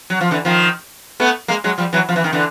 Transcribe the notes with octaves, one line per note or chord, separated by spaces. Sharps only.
F#3
F3
D3 E3
D#3 F3
A3 B3
G#3 A#3
F#3 G#3
F3 G3
E3 F#3
F3
E3
D#3
D3 E3